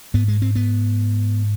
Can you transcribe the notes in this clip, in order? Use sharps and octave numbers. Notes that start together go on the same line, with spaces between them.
G#2 B3
G#3
C4
B3